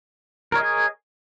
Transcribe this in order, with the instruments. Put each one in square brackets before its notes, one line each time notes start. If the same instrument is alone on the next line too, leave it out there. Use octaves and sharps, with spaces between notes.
[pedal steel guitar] A#4
C#5
D#5
G#4